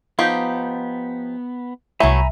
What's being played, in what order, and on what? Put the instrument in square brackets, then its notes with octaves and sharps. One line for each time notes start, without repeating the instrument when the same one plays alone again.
[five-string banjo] F3 D#4 G4 [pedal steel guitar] B3
[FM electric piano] C2 E5 [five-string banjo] E3 F#3 A3 [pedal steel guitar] G#5 A#5 B5